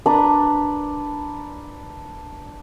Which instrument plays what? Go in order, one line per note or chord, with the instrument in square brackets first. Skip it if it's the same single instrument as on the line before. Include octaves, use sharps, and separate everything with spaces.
[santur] D4 B4 A#5